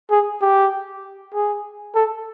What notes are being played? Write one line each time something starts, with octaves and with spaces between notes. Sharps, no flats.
G#4
G4
G#4
A4